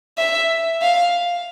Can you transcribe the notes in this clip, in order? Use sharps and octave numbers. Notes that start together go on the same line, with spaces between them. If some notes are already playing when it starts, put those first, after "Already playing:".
E5
F5